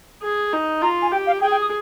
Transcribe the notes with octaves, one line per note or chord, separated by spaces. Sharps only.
G#4
D#4
F4 A#5
G#5
G4 G5
F5
G#4 G5
G5
D#6